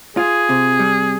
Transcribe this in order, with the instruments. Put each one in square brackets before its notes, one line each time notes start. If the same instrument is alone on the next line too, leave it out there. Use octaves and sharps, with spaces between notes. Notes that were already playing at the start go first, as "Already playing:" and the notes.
[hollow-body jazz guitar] F4 [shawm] G#4
[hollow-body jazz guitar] C3
G3